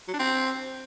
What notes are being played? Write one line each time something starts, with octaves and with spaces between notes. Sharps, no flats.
F#3
D4
C4